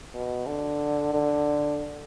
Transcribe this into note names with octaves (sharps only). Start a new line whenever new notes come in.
B2
D3
D3